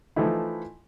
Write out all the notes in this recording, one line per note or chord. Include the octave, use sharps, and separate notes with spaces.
E3 F3 A3 D#4 E4